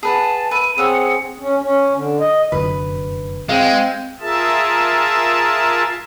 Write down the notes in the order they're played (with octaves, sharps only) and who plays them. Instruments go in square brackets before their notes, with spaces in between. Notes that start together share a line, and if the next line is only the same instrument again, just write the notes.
[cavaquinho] G#4 B4 F#5 [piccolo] A5
[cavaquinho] B4 E5 [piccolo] D#7
[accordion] C4 G#4 [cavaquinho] C#5 F#5 G#5 [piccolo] E6
[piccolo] C#7
[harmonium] C#4
C#4
D3
D#5
[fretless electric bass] F1 F#2 D3 [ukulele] B4
[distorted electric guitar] G#3 [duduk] C4 [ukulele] F5
[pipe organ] F4 G#4 A#4 E5 A5